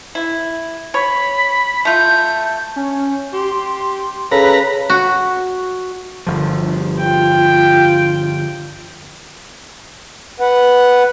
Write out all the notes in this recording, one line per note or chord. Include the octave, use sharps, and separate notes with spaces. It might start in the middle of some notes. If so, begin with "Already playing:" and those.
E4
C#5 B5
A3 F4 G6
C#4
G4 C6
C#3 A4 B4 A#5
F#4
G1 F3
F4 G5
B4 F#5